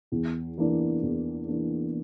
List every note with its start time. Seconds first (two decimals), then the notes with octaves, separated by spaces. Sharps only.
0.12 E2
0.58 E3 A#3 D4
1.03 E2
1.48 E3 A#3 D4